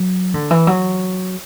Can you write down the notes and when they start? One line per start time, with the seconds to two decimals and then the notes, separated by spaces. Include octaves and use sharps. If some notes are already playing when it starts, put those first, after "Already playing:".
Already playing: F#3
0.34 D3
0.51 E3
0.67 F#3